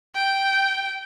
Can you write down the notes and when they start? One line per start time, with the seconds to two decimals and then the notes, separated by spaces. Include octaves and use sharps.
0.15 G5